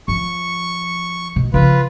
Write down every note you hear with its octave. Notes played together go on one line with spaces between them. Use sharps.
F3 C#6
B2
C#3 F3 F4 B4